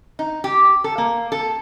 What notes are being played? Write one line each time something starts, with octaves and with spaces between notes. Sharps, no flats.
D#4
G4
A4
A#3
A4